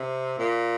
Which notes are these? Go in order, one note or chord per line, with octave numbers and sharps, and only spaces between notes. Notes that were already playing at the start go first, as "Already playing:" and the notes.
Already playing: C3
A#2